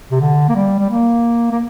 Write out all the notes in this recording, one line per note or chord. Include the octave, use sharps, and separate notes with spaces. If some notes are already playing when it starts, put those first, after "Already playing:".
C3
D3
A#3
G3
G3
A#3
A#3